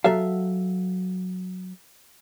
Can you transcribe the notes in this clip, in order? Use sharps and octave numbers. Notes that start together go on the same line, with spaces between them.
F#3 A4 E5 F5